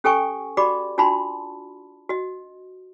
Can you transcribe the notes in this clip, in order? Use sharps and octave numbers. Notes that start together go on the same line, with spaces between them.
C#4 G4 A4 G5 G#5 C#6
F#4 G4 D5 B5 D6
D4 F4 F#4 A5 B5 C6
F#4 D#5